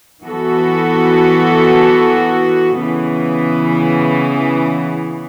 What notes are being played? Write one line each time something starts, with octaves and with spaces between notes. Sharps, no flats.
E3 B3 F#4 A4
C#3 E3 B3